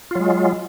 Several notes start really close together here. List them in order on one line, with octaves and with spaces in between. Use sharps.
F4 F#3 G#3